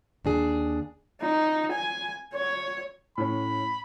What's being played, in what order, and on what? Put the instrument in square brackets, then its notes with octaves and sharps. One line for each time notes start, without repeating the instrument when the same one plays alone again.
[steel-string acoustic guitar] D#2 D4 G#4
[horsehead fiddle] D#4
G#5
C#5
[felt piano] A2 C#4 [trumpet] B5